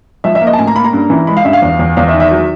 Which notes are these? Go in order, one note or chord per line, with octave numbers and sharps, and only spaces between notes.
F3 E5
E5
A#3
D#5
A5
A2 G#5
A#5
A#3 B5
A#5
G2
E3
G#3 B5
F5
G2 E5
F5
E2
E2
E2 F5
E5
D#3
E5
F#3